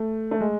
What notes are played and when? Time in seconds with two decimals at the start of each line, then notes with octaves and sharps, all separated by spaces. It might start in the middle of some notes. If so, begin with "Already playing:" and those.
Already playing: A3
0.31 A3
0.40 G#3